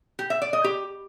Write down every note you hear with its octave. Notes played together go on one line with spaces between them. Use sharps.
G4
E5
D5
D#5
G4